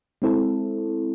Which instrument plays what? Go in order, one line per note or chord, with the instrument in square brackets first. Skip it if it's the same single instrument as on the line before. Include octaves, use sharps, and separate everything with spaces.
[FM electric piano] G#3 C4 E4 A4